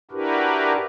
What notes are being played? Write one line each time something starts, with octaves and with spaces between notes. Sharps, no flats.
D4 E4 F#4 G4 A#4 B4